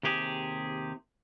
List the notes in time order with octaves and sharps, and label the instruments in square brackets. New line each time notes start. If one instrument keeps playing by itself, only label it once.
[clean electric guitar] D#2 C3 G4 G#4